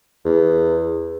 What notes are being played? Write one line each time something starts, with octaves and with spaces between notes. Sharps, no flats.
E2